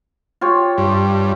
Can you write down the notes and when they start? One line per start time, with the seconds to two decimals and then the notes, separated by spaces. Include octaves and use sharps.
0.41 F4 G4 C#5
0.78 G2